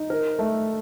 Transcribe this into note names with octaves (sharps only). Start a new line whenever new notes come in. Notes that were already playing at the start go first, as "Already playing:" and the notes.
Already playing: D#4
A#4
A3